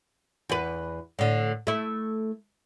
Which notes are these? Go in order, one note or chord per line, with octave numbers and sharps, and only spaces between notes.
E2 B4
A2 D3
A3 E4